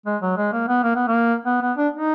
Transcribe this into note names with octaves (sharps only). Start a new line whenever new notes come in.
G#3
F#3
G#3
A#3
B3
A#3
B3
A#3
B3
B3
D4
D#4